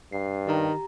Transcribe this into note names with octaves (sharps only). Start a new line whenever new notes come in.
G2 C7
D#3 G4 A#5